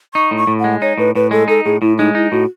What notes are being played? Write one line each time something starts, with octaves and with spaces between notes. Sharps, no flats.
D#4 C#6
A2
C#6
A2
G#3 F#5
D#4 C#5
A2 B4
A2 B4
G#3 A4
D#4 A4
A2 G#4
A2 E4
G#3 D#4
D#4 E4
A2 F#4